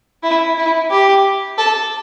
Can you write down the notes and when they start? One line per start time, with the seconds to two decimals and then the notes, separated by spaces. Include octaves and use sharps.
0.23 E4
0.57 E4
0.91 G4
1.58 A4